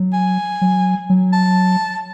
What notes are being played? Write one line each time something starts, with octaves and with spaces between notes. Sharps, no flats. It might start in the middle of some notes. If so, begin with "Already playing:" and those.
Already playing: F#3
G#5
F#3
F#3
A5